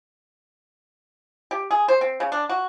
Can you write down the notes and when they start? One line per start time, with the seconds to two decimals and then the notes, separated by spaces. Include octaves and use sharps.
1.51 G4
1.71 G#4
1.88 C5
2.01 C4
2.20 C#3
2.32 D4
2.49 F#4